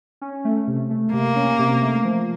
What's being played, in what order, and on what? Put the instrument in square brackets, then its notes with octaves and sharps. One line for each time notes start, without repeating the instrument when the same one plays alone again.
[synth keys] C#4
A3
C3
A3
[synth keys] C3 [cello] A#3
[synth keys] C#4
C3
A3
F3